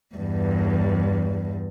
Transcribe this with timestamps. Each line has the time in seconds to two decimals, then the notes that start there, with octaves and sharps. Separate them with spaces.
0.15 E2 G2